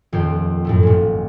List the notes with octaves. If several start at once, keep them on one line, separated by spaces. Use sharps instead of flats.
D#1 F2 G5
F#2 A2 A3
G#1 A#2